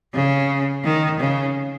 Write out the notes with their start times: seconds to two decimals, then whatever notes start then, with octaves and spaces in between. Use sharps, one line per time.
0.14 C#3
0.84 D#3
1.19 C#3